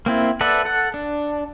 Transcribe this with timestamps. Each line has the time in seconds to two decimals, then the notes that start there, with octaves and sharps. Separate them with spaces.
0.06 A#3 C4 E4
0.41 A4 B4 D5 E5 F#5
0.65 A4 F#5
0.94 D4